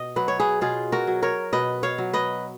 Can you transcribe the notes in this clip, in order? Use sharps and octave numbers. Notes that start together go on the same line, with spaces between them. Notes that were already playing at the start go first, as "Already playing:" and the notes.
Already playing: B2 D#5
F#3 B4
C#5
G#4 B4
B2 F4 G#4
F#4 A#4
F#3
A#4 C#5
B2 B4 D#5
C#5 F5
F#3
B4 D#5